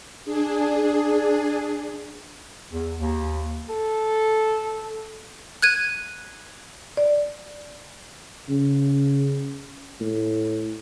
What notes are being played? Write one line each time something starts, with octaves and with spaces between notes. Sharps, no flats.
D4 G#4
E2
D#2
A4
F#6 G#6 D#7
D5
C#3
A2